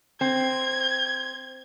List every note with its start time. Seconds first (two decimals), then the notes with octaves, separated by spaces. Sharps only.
0.21 C4 G#6